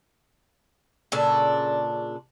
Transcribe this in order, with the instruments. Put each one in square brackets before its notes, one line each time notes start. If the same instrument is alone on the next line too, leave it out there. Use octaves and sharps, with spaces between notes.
[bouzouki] A#2 C#3 D4 A4